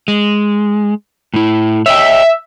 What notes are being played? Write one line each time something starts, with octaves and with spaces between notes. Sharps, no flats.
G#3
A2 E4
C#5 D#5 E5 G5